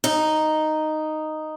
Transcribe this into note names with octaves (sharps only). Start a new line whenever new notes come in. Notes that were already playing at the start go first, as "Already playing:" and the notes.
D#4